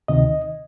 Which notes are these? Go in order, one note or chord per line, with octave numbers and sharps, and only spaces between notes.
D2 C3 D#3 D#5